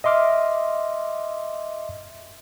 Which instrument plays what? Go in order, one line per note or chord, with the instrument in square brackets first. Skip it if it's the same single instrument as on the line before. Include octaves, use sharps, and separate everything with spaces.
[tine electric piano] D#5 E5 C6 D6 F6